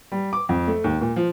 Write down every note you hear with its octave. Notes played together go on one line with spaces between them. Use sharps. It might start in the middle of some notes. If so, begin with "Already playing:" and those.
G3
D6
F2
A3
D#2
A#2
F3